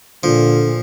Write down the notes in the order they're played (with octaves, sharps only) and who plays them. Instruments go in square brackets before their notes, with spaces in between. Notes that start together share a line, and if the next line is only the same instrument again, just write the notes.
[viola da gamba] A#2 [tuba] D3 [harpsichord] F3